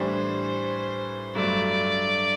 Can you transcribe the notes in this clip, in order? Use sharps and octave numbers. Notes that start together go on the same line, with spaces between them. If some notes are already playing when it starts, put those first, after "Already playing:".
Already playing: A2 E3 G3 D4 C5
G2 F#3 A3 D5